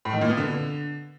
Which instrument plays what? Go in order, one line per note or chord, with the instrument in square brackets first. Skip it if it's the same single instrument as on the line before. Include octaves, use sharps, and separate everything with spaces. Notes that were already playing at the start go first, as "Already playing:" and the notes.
[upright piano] A2
D#3
A#2
B3
D3